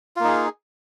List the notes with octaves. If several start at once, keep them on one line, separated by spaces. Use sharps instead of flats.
A#3 D#4 F4 G#4